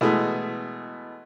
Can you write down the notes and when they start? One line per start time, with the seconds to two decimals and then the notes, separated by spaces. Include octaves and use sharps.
0.01 B2 E3 G#3 A3